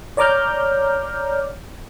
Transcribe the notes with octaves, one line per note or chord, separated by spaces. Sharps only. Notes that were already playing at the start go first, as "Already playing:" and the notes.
C#5 D5 A#5 D6 F6 G6